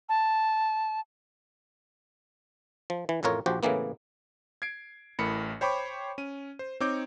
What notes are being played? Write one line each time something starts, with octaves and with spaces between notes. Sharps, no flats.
A5
F3
E3
A1 F2 A2 F4 A#4 C#5
A#1 F3 F#4 G4 C5
A2 C#3 E3 A#3 B3
G#6 C7 D7
A1 A2 A#4 B5 C#7
C5 C#5 G5 B5 C#6 D6
C#4 D#7
C5
C4 D#4 C#5 D6 G6